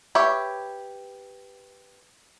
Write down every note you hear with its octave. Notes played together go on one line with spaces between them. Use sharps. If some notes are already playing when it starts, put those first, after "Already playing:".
G4 B4 C#5 E5